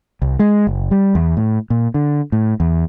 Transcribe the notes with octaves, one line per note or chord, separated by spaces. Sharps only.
C2
G#3
F#1
G3
E2
A2
A#2
D3
A2
E2